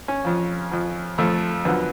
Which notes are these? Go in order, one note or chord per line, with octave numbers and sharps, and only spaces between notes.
C#4
F2 F3
F2 F3
F2 F3 A3
F#2 D3 F3 B3